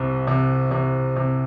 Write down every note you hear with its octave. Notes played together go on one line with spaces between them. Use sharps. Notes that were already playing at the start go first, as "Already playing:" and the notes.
Already playing: C2 C3
C3
C3
C3